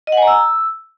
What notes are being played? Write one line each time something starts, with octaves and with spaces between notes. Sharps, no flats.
D#5
F#5
G#5
A#5
E6